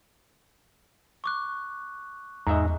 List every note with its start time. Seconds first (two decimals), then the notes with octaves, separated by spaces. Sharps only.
1.24 C#6 D6 F#6
2.47 E2 G#2 D#5 E5 A#5